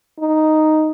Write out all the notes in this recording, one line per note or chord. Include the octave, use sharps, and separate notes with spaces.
D#4